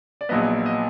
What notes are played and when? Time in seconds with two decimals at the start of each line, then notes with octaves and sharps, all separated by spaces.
0.21 D5
0.29 A#1 A#2 F#3 B3 D#5
0.66 D#5